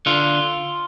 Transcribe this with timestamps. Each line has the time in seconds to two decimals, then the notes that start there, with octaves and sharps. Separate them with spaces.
0.06 D3 F4